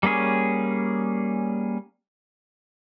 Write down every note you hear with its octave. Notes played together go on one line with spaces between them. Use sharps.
G3 A#3 C#4 G#4 C#5